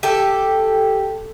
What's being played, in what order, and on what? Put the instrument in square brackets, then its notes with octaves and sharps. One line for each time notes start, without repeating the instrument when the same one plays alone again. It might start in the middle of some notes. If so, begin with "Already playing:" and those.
[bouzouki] G4 A4